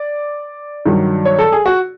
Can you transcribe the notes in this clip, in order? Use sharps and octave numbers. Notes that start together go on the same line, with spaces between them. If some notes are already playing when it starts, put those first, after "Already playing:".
Already playing: D5
G2 D#3 F#3
C#5
A4
G#4
F#4